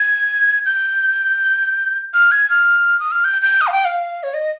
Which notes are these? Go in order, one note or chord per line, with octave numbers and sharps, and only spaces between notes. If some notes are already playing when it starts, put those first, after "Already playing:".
Already playing: G#6
G6
F6
G#6
F6
D#6
F6
G6
G6
D#6
F5
G5
F5
C#5
D#5